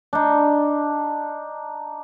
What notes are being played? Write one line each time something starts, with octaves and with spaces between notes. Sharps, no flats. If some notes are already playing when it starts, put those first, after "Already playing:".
D4 D#4